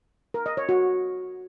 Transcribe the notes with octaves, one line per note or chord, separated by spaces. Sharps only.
A#4
D#5
C#5
F#4